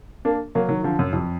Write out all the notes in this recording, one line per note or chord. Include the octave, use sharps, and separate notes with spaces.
A#3 D4
F#3 A#3
D#3 F#3
D3 F3
F#2
F2